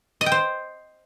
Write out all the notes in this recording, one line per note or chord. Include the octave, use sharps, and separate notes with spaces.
D#5
G5
C5